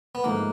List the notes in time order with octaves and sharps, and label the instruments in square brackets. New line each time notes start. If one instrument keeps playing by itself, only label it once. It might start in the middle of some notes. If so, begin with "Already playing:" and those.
[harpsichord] B3
[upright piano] G#2 F3 A3 [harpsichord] A#3